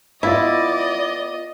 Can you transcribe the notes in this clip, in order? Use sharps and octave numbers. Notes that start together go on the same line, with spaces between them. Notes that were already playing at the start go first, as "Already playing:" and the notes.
B3 E4 F4 D5 D#5